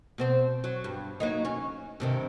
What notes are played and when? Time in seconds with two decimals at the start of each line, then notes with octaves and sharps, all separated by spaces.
0.18 B2 C4 C5
0.64 F#3
0.84 G2
1.20 F#3 A#3 D#4
1.45 C#4
2.00 G2 C3 D#3